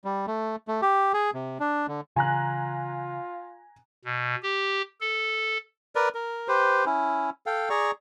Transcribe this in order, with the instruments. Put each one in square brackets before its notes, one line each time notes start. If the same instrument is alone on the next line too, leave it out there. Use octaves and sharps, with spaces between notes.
[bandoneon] G3
A3
A3
G4
G#4
C3
D4
D3
[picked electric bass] C#3 E3 [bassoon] F4 [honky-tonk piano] G#5 A#5 F#6
[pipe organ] B2
G4
A4
[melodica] A#4 B4 D5
A#4
G4 B4 C5
C#4 E4
A4 F5 G5
G#4 D5 A#5 C#6